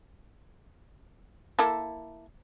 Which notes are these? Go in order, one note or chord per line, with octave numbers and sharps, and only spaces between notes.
A#3 E4 A4